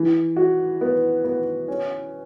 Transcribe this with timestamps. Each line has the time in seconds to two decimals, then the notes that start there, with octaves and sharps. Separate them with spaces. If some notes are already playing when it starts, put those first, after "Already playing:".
Already playing: E3
0.36 F#4
0.81 B3
1.24 B3
1.68 C#4